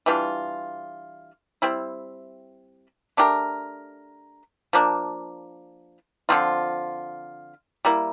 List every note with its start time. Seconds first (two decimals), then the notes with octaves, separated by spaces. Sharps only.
0.06 E3 G3 D4 F4
1.62 G3 C4 E4
3.17 A3 D4 G4 A#4
4.73 F3 A#3 D4
6.29 D3 F3 C4 F4
7.85 G3 A#3 E4